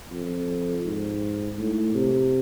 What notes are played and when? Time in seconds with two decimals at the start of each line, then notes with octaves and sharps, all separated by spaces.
0.11 F2
0.84 G#2
1.58 A2
1.94 C3